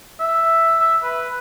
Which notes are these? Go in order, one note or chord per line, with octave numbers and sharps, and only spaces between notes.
E5
E5
B4